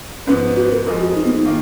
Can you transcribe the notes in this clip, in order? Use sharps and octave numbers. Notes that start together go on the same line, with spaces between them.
G#2 F3 B3 C#4
F#4
A#4
F2 F3 G#3 A#4
F#4
D#4
B3
D#4
D#3 A#3 F4